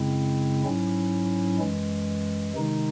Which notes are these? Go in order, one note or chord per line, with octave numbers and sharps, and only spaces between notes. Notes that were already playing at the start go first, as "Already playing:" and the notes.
Already playing: F#2 C#3 G#3 C4 E4
G#2 F#3 C#4 E4
F#2 E3 G#3
C3 D#3 G#3 D#4